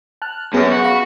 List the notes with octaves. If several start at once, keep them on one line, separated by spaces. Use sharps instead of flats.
A5 F6 F#6
F#2 B3 G#4
F#4
F5 B5 C#6